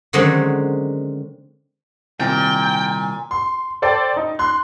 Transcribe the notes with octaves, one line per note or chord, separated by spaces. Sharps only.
D3 D#3 F#3 G#3 C4 C#4
C2 A#2 D#3 C4 G5 G#5
C6
A4 C5 D5 G5 A5
D#4
C6 F#6